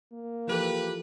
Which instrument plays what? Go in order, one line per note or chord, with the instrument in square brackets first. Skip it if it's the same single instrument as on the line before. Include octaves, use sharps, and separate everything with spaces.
[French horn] A#3
[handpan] E3 F3 A4 [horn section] G4 B4